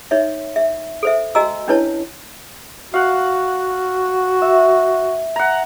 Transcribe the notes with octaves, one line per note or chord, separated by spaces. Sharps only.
D#4 C#5 E5
E5
A4 C5 E5
F#4 D#5 G#5 A#5 E6
C#4 D4 E4 B4 C#5 A5
F#4 F5 F#5
E5
F#5 A#5